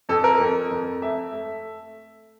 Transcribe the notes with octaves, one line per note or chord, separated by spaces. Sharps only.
F2 A4
A#4
F2
F2
A3 E5
A3